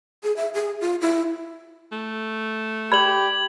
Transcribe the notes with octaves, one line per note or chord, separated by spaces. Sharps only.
G#4
E5
G#4
F4
E4
A3
G4 D5 B5 G#6 F#7